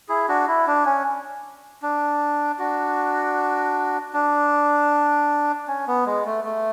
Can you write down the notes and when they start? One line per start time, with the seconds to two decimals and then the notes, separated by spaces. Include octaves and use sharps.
0.09 E4 G#4
0.28 D4 F#4
0.48 E4
0.67 D4
0.86 C#4
1.82 D4
2.59 D4 F#4
4.13 D4
5.68 C#4
5.87 B3
6.06 G#3
6.25 A3
6.44 A3